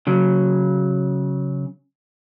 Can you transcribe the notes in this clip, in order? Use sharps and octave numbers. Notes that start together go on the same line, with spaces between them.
C#3 F#3